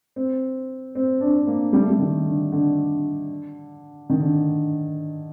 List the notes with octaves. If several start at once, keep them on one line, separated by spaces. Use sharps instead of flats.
C4
C4
D4
C4
A#3
G3
A3
G3
D#3
D3
D3
D#3
D3